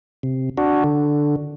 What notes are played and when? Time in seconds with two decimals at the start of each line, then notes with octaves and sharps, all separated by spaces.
0.23 C3
0.58 D4 F#4
0.84 D3